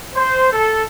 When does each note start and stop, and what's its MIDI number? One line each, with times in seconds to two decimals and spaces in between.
0.15 0.50 72
0.50 0.81 69